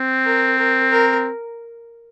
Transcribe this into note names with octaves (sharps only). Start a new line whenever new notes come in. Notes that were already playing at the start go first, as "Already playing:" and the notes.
Already playing: C4
A#4
A#4
A#4